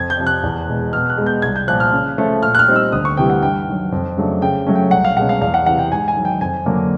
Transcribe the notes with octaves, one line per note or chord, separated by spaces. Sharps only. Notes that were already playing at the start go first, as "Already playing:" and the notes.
Already playing: F2 G#6
G6
C3 F3
F#6
E2
B2 G#3
B2 F6
F#6
G#3 B3
G6
C2 G#6
G6
A#2 F3 F#6
F6
C#3
F3 A3 C#4
A#2 F6
F#6
F6
G3 C4 D#4
E6
D2 D#6
C#6
C3 E3 G3 G5
F#5
G2 G5
D#3 F#3
F2
C#3 F#3 A3 D4
C#3 G5
F#3 A3 C#4
G5
C2 F#5
F5
B2 G#3 C#4 F#5
F5
E2 F5
F#5
C3 E3 F#5
G5
G#2 G#5
G#5
D#3 F#3
G5
F2 G#5
D3 F#3 A#3 D4